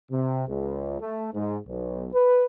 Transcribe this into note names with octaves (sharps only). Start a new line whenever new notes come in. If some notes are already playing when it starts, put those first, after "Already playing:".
C3
C#2
A3
G#2
B1
B4